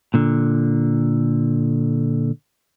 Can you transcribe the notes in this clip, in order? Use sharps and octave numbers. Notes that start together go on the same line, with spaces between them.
A#2 D3